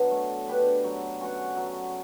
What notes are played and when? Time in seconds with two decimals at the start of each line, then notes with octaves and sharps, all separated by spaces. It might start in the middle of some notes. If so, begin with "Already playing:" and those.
Already playing: F#3 B3 D4
0.11 A3
0.48 D4 G4 B4
0.84 F#3
1.21 C#4 F#4 C#5
1.56 F#3